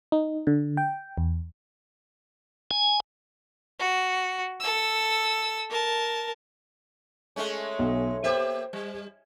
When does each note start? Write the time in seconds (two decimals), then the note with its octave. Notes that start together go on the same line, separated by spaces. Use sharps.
0.12 D#4
0.47 D3
0.77 G5
1.18 E2
2.71 G#5
3.79 F#4
4.60 A4 E6
5.70 A#4 A5
7.36 G#3 A3 C#4
7.79 B1
8.24 A#3 G4 C5 E5
8.73 G3